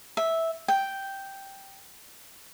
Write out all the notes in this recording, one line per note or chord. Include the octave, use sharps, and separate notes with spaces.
E5
G5